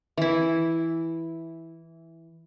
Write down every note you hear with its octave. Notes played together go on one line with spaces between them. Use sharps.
E3 E4